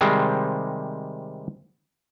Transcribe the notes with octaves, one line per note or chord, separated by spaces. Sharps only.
C3 D#3 G3 G#3 C4